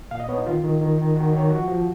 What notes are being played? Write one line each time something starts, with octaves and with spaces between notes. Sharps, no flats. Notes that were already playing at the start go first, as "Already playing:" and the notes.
A#2 F5
D#5
B3 C#5
D#4
D#3 F4
D#3
D#3
D#3
D#3 F#4
D#3 C#5
F3 F#4
F3